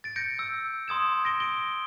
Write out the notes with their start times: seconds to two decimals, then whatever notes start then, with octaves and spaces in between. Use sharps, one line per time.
0.04 A6 D7
0.16 G6 A#6 C#7 D7
0.39 E6
0.88 C6 D#6 G#6 E7
1.25 A#6 D7 G7
1.40 D7 G7